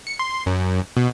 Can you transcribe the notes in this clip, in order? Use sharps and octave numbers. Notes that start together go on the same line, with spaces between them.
C#7
C6
F#2
B2